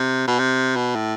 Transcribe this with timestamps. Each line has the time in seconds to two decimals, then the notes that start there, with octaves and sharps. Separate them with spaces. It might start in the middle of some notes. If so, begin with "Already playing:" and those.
Already playing: C3
0.27 B2
0.39 C3
0.76 B2
0.96 A2